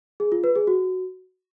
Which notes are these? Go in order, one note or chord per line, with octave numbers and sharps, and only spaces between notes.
G#4
F4
B4
G#4
F#4